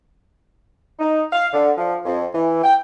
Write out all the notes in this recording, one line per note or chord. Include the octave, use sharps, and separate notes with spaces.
D#4
F5
D3
F3
F2
E3
G5